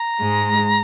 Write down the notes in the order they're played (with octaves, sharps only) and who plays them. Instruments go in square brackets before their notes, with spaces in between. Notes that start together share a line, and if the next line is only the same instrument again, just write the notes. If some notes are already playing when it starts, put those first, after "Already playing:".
Already playing: [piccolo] A#5
[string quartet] G#2 G#3